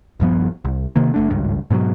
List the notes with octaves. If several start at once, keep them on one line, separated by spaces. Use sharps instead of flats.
D#1 G2 F3 B3
C2
C3 D#3 A#3
F#1 A3 D4
G#1 C#2 G2
G#2 B2 E3 F#3